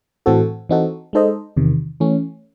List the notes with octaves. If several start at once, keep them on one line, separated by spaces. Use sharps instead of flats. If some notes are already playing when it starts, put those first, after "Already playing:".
A2 E3 C4 F#4 A4
E3 C4 D#4 F#4 A4
G#3 D#4 A4 C5 D#5
E2 C3 D#3
E3 A3 C#4